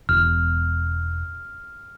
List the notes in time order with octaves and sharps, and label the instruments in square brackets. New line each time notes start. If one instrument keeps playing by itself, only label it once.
[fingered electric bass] E1 [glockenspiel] F6